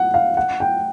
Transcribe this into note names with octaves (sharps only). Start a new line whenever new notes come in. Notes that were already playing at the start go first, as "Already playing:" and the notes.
Already playing: F#5
F5
F#5
G5